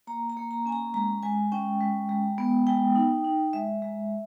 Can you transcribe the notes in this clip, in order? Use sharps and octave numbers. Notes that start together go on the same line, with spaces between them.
A#3 A#5
A#5
A#3
A#5
C#4 G#5
A#5
G#3 A#5
G#3 G#5
C#4 G5
G#3
G#3
B3
G#3 G5
D#4
D#4
G#3 E5
G#3